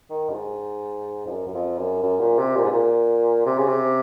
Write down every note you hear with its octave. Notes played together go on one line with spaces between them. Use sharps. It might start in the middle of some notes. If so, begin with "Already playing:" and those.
D#3
F#2
G#2
F2
F#2
F#2
F2
F#2
F#2
A#2
C3
A#2
G#2
A#2
C3
C#3
C3